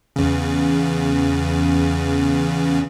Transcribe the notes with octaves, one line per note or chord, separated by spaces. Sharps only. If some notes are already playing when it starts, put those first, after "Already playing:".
E2 C#3